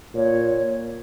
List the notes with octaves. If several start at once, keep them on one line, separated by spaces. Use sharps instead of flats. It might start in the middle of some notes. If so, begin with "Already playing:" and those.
A#2 C#5